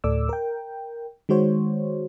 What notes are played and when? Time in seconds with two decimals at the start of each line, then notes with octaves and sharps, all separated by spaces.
0.04 D2 A2 A4 D5 D6 E6
0.29 A#4 G5
1.29 D#3 G#3 F#4 C5 C#5